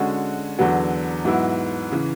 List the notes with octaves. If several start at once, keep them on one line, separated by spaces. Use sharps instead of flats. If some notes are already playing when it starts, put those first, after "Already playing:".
Already playing: D3 G#3 C#4 F#4
E2 D3 F#3 B3
G#2 F#3 B3 E4
C#3 E3